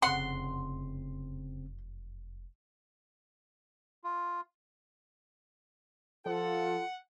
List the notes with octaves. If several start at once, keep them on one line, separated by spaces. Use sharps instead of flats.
F1 F#2 C#3 C4 F#5 C6
F4
F3 F4 A4 F#5